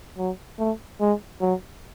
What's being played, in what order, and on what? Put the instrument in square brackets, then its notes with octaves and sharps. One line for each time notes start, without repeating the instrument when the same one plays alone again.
[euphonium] F#3
A3
G#3
F#3